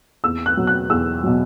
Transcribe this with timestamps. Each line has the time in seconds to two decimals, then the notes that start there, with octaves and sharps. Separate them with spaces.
0.24 E2 E6
0.46 F#6
0.57 B2 F#3
0.67 F#6
0.90 E2 E6
1.24 B2 F#3